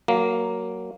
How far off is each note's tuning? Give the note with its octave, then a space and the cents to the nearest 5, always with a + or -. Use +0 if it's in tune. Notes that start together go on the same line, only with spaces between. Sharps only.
F#3 +10 A#3 +0